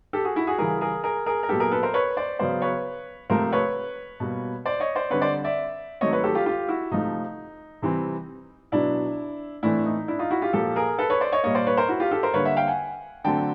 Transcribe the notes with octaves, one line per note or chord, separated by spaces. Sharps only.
G4 A4
F#4 G#4
E4 F#4
F#4 G#4
C#3 E3 G3 G#4 A#4
G#4 A#4
G#4 A#4
G#4 A#4
A#4
A#2 F#3 B3 G4 A4
G#4 A#4
A4 B4
A#4 C5
B4 C#5
C5 D5
C#3 F#3 B3 C5 D5
B4 C#5
C3 F3 A3 C4 A#4 C5
B4 C#5
B2 G3 A#3
C5 D5
C#5 D#5
C5 D5
D3 G3 C4 B4 C#5
C5 D5
D5 E5
D#3 F#3 A3 C4 C#5 D#5
B4 C#5
G4 A4
F4 G4
F4 G4
E4 F#4
C3 F3 A3 D#4
C3 E3 G3 C4
B2 F#3 B3 D4 E4
A2 E3 A3 C4 D4 E4
D#4
D4 E4
D#4 F4
E4 F#4
F4 G4
A#2 F3 A#3 G4 A4
G#4 A#4
A4 B4
B4 C#5
C5 D5
C#5 D#5
A#2 G3 A#3 C#5 D#5
C5 D5
B4 C#5
A#4 C5
E4 F#4
F4 G4
G4 A4
A#4 C5
D3 G3 A#3 B4 C#5
E5 F#5
F5 G5
F#5 G#5
D3 F#3 A3 C4 G5 A5